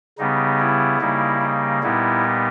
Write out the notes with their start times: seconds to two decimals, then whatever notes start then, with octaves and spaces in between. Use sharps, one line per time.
0.19 C#3 G3 B3 D#4
0.60 E4
1.01 C#3 G3 A#3 D#4
1.42 D#4
1.82 A#2 G3 B3 D#4 E4